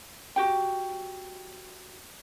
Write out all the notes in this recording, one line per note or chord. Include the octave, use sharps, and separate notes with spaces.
F#4 G4 G5